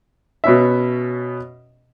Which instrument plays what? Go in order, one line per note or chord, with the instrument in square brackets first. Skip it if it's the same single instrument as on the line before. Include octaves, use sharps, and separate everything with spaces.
[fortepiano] B2 B3 C#4 E5